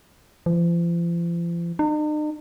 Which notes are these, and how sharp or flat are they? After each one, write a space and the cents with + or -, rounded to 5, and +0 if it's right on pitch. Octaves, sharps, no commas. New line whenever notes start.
F3 -40
D#4 -45